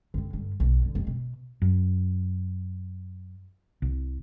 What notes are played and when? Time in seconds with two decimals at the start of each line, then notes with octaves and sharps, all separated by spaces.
0.14 D3 C4
0.33 G2 D3
0.60 B1
0.81 D3 F3
0.95 F1
1.07 B2
1.62 F#2
3.82 C2